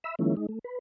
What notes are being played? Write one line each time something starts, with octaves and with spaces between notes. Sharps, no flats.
E5 B5 E6
D#3 F3 G#3 A#3 C#4 E4
G#3 D#4
A3
B4